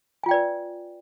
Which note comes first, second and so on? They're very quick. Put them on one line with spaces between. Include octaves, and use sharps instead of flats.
G#5 F4 G5 D5 B4